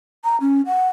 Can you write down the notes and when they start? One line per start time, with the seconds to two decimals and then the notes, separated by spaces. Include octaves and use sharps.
0.24 A#5
0.41 C#4
0.66 F#5